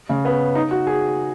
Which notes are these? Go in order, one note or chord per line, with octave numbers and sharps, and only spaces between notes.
C#3
B3
D#4
F#4
G#4